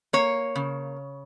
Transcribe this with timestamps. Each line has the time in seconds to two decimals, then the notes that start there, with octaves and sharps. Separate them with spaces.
0.13 A#3 C#5
0.56 C#3